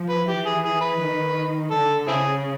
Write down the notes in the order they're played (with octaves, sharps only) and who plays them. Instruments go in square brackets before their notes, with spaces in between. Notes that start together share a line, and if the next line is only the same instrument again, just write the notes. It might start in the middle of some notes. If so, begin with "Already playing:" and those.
Already playing: [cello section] F3
[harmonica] B4
[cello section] E3 [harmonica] G4
[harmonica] G#4
G#4
B4
[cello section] D#3
[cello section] D3 [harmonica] A4
[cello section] C#3 [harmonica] C4 E4 G#4